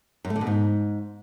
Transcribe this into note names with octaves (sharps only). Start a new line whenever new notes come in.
F#2
A3
D3
B2
G#2